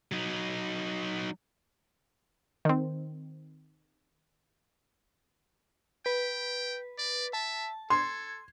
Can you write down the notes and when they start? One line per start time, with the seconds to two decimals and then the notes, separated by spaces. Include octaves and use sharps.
0.12 F#3 D#4
2.65 D#3 C4
6.06 B4 G5
6.98 D5
7.33 E5 A5
7.90 A4 C6 G#6